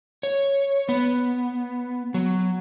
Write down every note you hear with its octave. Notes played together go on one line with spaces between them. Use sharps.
C#5
B3
F#3